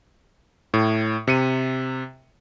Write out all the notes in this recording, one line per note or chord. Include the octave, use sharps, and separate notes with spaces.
A2
C3 C#7 D#7